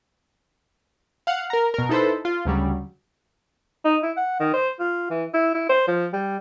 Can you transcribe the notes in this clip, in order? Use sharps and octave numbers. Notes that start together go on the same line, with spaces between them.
F5 F#5
A#4 A#5
B2 A#4
D#4 E4 A4 B4 C5
F4
D2 C#3 F#3 G3
D#4
E4
F#5
D#3
C5
F4
E3
E4
E4
C5
F3
G3